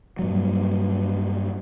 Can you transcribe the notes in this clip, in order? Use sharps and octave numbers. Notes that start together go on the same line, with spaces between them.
G2 A#2 F#3